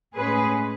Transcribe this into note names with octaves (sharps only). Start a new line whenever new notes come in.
A2 G#3 C#4 G#4 B4